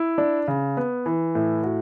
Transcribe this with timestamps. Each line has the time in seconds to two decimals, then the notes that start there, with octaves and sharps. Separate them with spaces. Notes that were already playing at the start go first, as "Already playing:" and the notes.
Already playing: E4
0.18 D4
0.48 C#3
0.77 B3
1.06 E3
1.35 A2
1.63 F#4